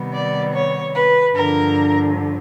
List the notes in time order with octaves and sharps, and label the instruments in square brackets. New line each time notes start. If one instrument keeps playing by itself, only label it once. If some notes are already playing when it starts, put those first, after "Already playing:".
Already playing: [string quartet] C3 D#3 G3 B3
D5
C#5
B4
G2 D3 F3 A#4